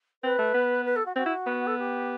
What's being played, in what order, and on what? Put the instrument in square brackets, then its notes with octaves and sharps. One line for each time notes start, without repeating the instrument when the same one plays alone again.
[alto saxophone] C4 [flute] B4
[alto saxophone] A3
B3
[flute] B4
A4
F#4
[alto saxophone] C4 [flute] F#4
[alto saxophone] E4
B3
[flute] A4
G4